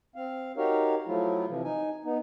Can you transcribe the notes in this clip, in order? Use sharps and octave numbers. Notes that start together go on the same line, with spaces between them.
C4 F5
D#4 F#4 G4 A#4 C#5 F5
F3 F#3 A3 E4 F4
C3 E3 F3
D#4 G#5
B3 D#4